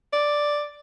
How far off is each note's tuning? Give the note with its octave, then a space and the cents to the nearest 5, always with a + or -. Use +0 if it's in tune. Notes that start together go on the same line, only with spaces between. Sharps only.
D5 +0